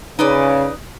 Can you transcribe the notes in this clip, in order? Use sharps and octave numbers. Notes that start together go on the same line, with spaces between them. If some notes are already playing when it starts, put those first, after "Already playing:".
C#3 D#4 B4 D5